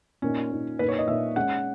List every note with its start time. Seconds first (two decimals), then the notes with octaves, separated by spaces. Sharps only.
0.22 A#2 A#3 C#4 D#4
0.51 A#2 A#3 D#4
0.79 A#2 A#3 D#4 B4
0.88 C#5
0.99 D#5
1.07 A#2 A#3 D#4 E5
1.36 G#3 C#4 G#4 F#5